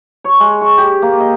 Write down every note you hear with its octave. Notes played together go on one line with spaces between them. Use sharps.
C#5
G#3
C#6
G4
A#3
D#5